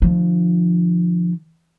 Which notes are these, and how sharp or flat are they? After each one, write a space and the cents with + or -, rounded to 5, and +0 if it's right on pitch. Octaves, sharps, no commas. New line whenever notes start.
D3 +45 F3 +0